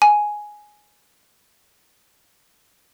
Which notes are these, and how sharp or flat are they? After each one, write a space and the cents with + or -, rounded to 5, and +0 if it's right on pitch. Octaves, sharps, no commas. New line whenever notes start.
G#5 +5